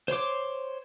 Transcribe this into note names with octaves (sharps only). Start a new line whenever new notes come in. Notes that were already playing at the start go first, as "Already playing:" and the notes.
C5 C#5 C6 D6